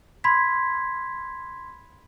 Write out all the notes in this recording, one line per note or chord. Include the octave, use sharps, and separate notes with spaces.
B5 C6 G#6 B6